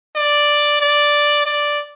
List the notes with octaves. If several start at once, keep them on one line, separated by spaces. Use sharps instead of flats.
D5
D5
D5